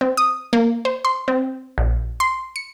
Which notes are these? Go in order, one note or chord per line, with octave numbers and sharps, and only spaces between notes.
C4
D#6
A#3
C5
C6
C4
A#1
C6
C#7